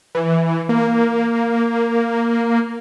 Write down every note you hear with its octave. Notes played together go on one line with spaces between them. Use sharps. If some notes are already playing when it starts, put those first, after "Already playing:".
E3
A#3